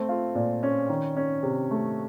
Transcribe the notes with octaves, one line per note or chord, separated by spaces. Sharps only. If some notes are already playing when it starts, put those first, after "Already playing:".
Already playing: A3 C4
F4
A#2
C#4
D#3
C#4
C3
A3